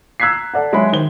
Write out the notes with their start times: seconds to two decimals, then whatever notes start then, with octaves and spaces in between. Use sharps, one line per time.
0.20 A#5 E6 F#6 G#6 B6 C7
0.54 A4 D5 F#5
0.72 F#3 G#3 G#4 C#5 E5 B5
0.92 D#3 C5 G7